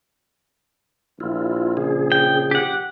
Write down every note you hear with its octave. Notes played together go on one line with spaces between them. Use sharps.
A#1 E4 F4
C#3 G#4
G5
G4 F#5